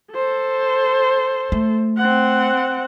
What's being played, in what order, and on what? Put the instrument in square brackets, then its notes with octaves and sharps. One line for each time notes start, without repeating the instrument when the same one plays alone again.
[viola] A4 C5
[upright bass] A3
[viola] C4 F#5